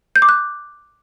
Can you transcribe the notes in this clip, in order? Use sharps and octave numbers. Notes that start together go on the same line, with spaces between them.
G6
D6
F#6